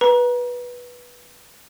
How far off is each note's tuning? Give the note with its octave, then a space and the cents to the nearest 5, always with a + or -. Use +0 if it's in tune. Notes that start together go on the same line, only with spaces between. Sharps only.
B4 -15 A#5 +30